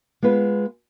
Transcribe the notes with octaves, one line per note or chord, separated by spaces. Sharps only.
G#3 B3 F4 B4